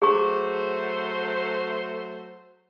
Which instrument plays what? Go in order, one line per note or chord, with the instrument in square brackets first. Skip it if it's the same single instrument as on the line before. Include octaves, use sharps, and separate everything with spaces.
[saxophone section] F#3 A3 C5 [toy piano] G#4 C#6